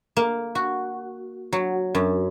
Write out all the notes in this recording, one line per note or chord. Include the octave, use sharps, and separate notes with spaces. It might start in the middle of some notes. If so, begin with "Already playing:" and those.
A#3
F#4
F#3
F#2